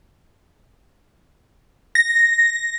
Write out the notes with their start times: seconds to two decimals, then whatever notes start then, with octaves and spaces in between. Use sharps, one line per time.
1.95 A#6